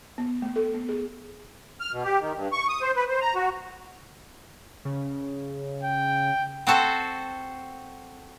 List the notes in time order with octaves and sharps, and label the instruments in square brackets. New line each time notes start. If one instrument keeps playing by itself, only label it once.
[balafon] B3
A3
A4
B3
G#4
[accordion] F6
B2
G4
D#3
G2
C#6
D#6
C5
B4
C5
A#5
F#4
[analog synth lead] C#3
[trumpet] G5
[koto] C4 F#4 A4 C5